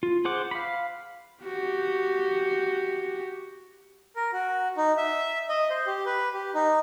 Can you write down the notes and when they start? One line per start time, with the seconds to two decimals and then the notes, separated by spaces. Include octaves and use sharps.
0.03 F4
0.25 G#4 C5 F#5 D6
0.51 F5 B5
1.43 F#4 G4
4.16 A#4
4.33 F#4
4.77 D#4
4.97 E5
5.49 D#5
5.70 C5
5.87 G4
6.06 B4
6.34 G4
6.54 D#4